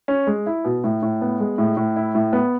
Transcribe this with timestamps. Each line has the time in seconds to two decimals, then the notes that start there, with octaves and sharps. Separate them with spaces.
0.08 C#4
0.27 G#3
0.46 E4
0.64 B2
0.84 A2
1.02 A2
1.21 B3
1.40 G#3
1.58 A2
1.77 A2
1.96 E4
2.15 A2
2.33 B3